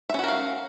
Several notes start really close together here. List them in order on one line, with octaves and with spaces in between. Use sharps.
E5 C#4 F#4 A#4 F5